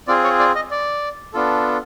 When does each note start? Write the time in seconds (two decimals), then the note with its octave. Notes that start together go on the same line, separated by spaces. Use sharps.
0.08 C4 F4 G#4 D5
0.24 C#5
0.39 D5
0.55 D#5
0.71 D5
1.33 B3 D4 F4 A4